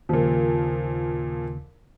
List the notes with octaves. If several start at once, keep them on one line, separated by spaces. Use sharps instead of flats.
D#2 A#2 C#3 F3